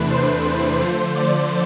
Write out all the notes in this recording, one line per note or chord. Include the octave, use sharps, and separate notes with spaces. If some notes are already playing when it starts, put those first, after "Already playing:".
Already playing: E2 C3 E3 A3 D4 B4
C5
C5
D3 F3 A3 C5
D5